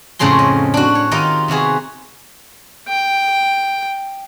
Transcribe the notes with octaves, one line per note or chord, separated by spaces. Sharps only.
F2 A2 C#3 C4 G#4 C6
D#5
D4 F#4
C#5
D#3 D#4 F4 G4 A#4 D#5
C3 B3 F#4 G#4
G5